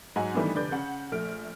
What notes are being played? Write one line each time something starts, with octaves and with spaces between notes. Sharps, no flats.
G#2 F#3 D#4 F#5 G#5
D#3 E3 G3 A3 B3 D4
F1 D3 B4 D5 G6
C#3 F#5
A#1 A3 F6 D7